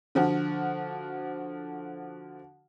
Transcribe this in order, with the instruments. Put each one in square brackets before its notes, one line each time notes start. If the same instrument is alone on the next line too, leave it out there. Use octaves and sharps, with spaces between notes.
[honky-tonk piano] D3 F3 F#4